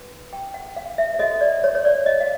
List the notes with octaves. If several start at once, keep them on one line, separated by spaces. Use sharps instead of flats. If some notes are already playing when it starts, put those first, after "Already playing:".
Already playing: D#4 F#4 B4
G5
F#5
F5
E5
E5
F#4 A4 C#5 D#5
D5
C#5
C#5
D5
D#5
F5